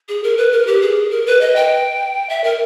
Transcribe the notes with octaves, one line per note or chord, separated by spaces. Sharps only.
G#4
A#4
B4
A#4
G4
G#4
A#4
B4
D#5
G5
E5
A#4